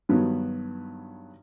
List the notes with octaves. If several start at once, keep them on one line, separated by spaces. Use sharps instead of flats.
G2 D#3 F#3 B3